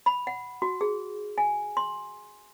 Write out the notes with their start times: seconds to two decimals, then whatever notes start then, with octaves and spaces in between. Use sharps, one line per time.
0.06 B5
0.27 F#5
0.62 F#4
0.81 G#4
1.38 G#5
1.77 C6